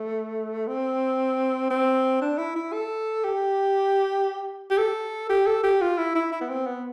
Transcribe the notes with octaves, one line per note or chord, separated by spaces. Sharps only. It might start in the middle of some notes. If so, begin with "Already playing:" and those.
Already playing: A3
C4
C4
D4
E4
E4
A4
G4
G4
A4
G4
A4
G4
F4
E4
E4
E4
B3
C4
B3